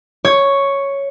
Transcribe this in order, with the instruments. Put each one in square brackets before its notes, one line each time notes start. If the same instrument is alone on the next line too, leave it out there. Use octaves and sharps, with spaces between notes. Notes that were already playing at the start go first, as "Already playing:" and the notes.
[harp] C#5